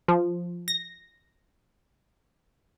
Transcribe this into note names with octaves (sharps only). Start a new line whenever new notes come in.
F3
A#6